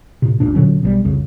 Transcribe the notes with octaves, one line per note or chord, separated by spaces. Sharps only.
A2 C3
G#1 D#2 A#2 D4
A#2 D3 F#3 C#4
B1 E3 G3
C2 F2 C#3